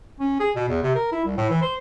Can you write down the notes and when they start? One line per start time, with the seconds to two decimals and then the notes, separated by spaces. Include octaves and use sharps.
0.20 C#4
0.40 G#4
0.55 B2
0.69 E2
0.83 C3
0.95 A#4
1.12 E4
1.25 C2
1.37 A2
1.50 E3
1.62 C5